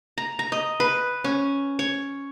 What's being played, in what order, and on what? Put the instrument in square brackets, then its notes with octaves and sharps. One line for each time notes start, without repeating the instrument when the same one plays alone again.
[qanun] A#5
A#5
D#5
B4
C#4
C#5